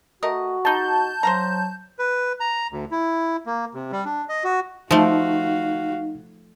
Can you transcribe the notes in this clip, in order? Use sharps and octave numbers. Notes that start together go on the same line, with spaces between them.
A3 F#4 A#4 D#5
G#3 D#4 A5 G6
F#3 C5 F5 A#5
B4
A#5
D2
E4
A#3
C3
G3
D4
D#5
F#4
F3 A3 D#4 F#4 F5